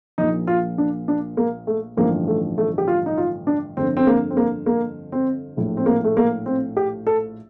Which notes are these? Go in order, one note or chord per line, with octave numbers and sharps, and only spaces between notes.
A#1 A#2 F3 D#4
F4
D4
D4
A#3
A3
A1 G2 D3 F3 A#3
A3
A3
G4
F4
D#4
F4
D4
G1 F2 D3 C4
C4
A#3
C4
A#3
A#3
C4
A#1 A2 F3
C4
A#3
A3
A#3
C4
G4
A4